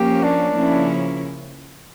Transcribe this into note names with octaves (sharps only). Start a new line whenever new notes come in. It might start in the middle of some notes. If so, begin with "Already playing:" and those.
Already playing: F3 A#3 C#4 G4
D4
C#3 F3 A#3 C#4 E4